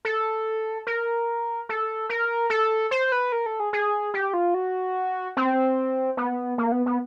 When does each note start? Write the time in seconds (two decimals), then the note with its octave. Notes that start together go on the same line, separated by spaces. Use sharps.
0.05 A4
0.87 A#4
1.69 A4
2.09 A#4
2.50 A4
2.91 C5
3.12 B4
3.32 A#4
3.46 A4
3.60 G#4
3.73 G#4
4.14 G4
4.34 F4
4.54 F#4
5.37 C4
6.17 B3
6.58 A#3
6.72 B3
6.86 B3